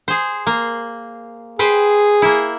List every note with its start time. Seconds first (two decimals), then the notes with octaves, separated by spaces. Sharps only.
0.08 G#4 C5
0.47 A#3
1.59 G#4 B4 C5 G5
2.22 A#3 E4